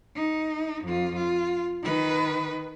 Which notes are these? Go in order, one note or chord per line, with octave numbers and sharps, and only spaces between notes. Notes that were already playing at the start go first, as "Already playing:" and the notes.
D#4
F2 F4
F4
D#3 B4